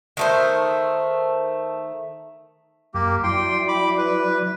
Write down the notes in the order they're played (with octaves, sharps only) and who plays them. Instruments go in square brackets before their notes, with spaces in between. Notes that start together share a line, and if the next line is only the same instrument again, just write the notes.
[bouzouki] D#3 A3 C5
[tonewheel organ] F#2 [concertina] A#3 G4
[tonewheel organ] F#3 E4 D5 [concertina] G5 C6
[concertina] B5 D6
B4